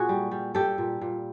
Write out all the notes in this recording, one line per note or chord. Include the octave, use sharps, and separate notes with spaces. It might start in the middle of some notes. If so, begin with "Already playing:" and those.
Already playing: A#2 F#4 G#4
G3
G3
G3 G4 A4
A#2
A#2